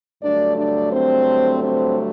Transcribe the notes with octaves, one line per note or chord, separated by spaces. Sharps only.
G2 D3 F#3 A3 D4 D5
D4 D5
C4 C5
C4 C5